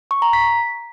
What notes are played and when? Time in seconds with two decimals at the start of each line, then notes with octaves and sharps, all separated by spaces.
0.11 C#6
0.22 A#5
0.33 B6